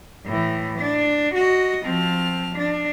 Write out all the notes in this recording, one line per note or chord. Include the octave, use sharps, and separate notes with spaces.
A2 E3
D4
F#4 D#5
F3 C4 A5 F6
D4